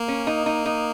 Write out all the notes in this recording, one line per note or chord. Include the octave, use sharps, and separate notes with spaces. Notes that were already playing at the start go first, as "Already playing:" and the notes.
Already playing: A#3
C#4
D#4
D#4
D#4